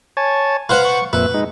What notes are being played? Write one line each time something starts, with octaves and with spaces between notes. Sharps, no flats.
C#5 G#5 A5
B4 C5 F5 F#5
C#6
F2 A#2 B4 E5
G#3 D#4